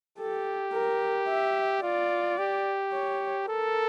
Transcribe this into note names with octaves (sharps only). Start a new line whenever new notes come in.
G4 A4
A#4
E5
F4 D5
G4
C#5
A4 A#4